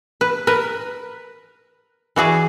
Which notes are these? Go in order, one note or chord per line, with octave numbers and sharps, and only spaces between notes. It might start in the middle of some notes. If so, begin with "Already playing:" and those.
B4
A#4 B4
E3 F#4 G#4 D5